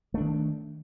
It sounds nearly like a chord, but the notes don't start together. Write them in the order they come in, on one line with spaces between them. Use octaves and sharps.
A3 D4 D#3